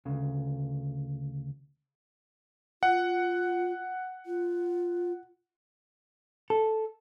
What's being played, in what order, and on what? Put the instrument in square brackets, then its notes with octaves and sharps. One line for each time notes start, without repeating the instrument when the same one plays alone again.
[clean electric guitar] D2 C#3
[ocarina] F4 [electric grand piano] F#5
[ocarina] F4
[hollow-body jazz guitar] A4